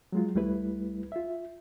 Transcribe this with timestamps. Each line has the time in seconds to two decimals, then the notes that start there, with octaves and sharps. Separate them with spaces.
0.12 F#3 G#3 F4
0.35 C#2 G3 A3 E4 B4
1.12 F4 E5